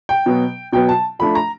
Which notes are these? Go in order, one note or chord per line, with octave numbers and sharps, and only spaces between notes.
G5
B2 F#3 B3
B2 F#3 B3 G5
A5
F3 A3 D4 B5
A#5